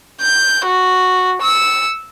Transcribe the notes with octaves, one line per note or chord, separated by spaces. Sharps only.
G6
F#4
E6 C#7